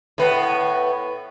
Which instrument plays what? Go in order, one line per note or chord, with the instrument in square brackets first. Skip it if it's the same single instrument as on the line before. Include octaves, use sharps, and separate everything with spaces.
[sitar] A2 B3